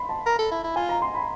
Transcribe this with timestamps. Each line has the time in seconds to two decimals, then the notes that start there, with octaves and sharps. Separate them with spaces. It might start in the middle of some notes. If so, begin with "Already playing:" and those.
Already playing: B5 C6
0.09 A5
0.26 A#4
0.39 A4
0.52 E4
0.64 E4
0.76 F4 G#5
0.89 A#5
1.02 C6
1.15 B5